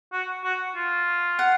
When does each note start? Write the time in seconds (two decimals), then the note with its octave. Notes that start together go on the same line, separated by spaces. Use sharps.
0.12 F#4
0.44 F#4
0.76 F4
1.39 F#5